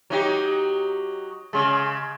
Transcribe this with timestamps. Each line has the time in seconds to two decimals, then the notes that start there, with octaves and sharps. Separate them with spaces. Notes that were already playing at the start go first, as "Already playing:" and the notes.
0.10 F#3 D#4 G4
1.53 C#3 G#3